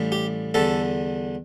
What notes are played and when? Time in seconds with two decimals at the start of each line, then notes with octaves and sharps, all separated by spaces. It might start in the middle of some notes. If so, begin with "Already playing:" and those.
Already playing: A1 A2 G3
0.12 G4
0.54 E2 D3 G3 A4